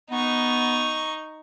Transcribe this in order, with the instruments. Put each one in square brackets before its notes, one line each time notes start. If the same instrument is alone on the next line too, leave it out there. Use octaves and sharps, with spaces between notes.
[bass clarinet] B3 [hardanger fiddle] D#4 C#6